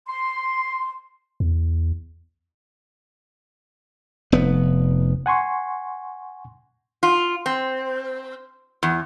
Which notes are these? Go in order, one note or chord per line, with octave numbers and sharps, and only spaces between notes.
C6
E2
F1 B3
F#5 G#5 C6 C#6
F4
C4
E2